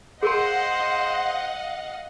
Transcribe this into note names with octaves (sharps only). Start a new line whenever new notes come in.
G#4 A#4 C5 D#5 F5 F#5 C6